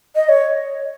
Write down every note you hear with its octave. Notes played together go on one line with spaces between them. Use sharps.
D#5
C#5